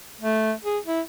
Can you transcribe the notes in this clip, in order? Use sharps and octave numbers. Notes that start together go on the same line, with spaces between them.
A3
G#4
E4